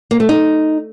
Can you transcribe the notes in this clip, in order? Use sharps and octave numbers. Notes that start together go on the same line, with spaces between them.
A#3
A3
D#4